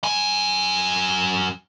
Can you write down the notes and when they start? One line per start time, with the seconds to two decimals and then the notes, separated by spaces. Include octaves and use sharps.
0.04 F#2 G#5